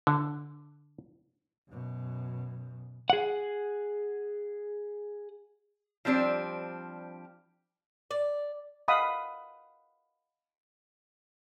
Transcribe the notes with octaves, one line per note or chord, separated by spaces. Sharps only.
D3
F#2 B2
G#4 F#5
F3 G3 C4 D4
D5
D#5 F5 F#5 B5 D#6